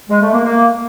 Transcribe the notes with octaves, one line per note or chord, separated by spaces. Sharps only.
G#3
A3
A#3
A#3